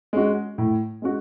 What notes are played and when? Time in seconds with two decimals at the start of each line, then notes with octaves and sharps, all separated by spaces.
0.13 G#3 C#4 F#4
0.58 A2
1.02 G#3 C#4 F#4